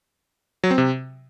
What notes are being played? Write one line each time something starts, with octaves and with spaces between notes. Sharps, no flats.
F#3
C4
C3